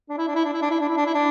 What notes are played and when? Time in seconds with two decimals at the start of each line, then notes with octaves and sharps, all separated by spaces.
0.09 D4
0.18 E4
0.28 D4
0.35 E4
0.45 D4
0.53 E4
0.62 D4
0.71 E4
0.80 D4
0.88 E4
0.97 D4
1.06 E4
1.14 D4